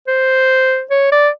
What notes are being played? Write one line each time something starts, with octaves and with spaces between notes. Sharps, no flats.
C5
C#5
D5